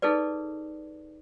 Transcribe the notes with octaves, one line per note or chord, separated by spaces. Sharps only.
D#4 G#4 A4 B4 D5